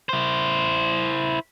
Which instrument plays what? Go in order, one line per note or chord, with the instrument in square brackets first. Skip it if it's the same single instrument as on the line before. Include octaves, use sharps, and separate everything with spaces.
[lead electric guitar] E4 C5